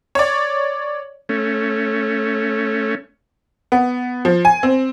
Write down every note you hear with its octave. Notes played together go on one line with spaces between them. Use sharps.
C#5 D5
A3 C#4
B3
F3
G#5
C4